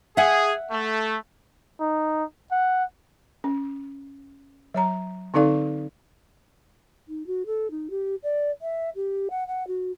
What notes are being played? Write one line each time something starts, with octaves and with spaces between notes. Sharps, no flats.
G#4 E5 F#5
A3
D#4
F#5
C#4
F#3 C#5 A#5
D3 C4 D#4 A4 D5 F5
D#4
F#4
A4
D#4
G4
D5
E5
G4
F#5
F#5
F#4